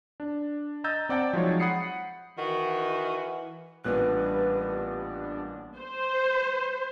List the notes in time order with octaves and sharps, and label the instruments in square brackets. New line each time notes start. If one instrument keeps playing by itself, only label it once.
[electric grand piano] D4
D#5 A#5 E6 G6 A6
C4 D5 F#5 G5 A5
F3 F#3 G#3 D#4 F4 C#5
F#5 B5 D#6 C7 C#7
[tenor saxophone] D#3 [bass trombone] E3 [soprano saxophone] F#4
[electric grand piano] A1 A#2 F#6 [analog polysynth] G3 B3 D4 [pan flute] B4
[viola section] C5